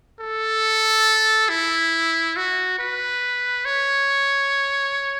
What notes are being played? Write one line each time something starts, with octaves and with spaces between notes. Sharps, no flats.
A4
E4
F#4
B4
C#5